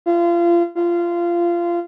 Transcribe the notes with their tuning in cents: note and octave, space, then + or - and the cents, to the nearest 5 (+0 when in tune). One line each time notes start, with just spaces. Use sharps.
F4 -30
F4 -20